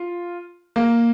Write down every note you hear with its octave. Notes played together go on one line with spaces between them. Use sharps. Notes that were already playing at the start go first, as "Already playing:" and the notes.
Already playing: F4
A#3